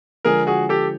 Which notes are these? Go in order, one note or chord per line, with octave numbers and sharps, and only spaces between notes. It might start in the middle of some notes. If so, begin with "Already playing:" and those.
D3 F3 G#3 G#4 A#4
F#4 G#4
G4 A4